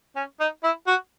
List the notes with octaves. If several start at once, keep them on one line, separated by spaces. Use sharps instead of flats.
C#4
D#4
E4
F#4